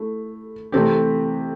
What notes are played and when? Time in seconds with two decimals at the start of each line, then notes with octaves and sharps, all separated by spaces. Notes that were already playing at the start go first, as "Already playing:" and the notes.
Already playing: A3 E4
0.72 C3 E3 A3 C4 G4